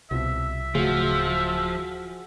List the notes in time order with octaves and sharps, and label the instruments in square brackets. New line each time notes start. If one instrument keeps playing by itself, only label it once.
[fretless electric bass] C2 [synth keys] B2 F3 [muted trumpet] E5
[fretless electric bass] D1 C#3 A3 [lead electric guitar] F3 [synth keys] F#4 G#4